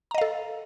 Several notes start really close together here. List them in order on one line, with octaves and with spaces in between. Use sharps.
A#5 D#5 F5 A4